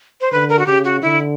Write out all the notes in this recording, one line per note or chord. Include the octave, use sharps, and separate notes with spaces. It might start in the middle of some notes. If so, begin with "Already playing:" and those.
C5
D3 B4
A#4
F#4
C#3 G4
F#4
D3 E4